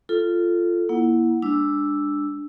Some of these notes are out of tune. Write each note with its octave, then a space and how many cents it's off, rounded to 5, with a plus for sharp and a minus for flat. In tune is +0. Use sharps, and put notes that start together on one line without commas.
F4 -10 A4 +0
A#3 +30 E4 +0 F#5 -10
G#3 -30 D4 +5 E6 +0